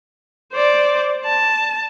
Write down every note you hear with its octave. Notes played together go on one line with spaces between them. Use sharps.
C5 D5
A5